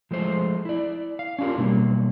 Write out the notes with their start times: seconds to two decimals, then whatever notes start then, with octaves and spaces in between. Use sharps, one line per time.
0.11 F3 G#3 A3 C5
0.65 E4 D5
1.19 F5
1.39 C#4 D4 F4 G4 A#4
1.58 B2 F#3 G3 A#3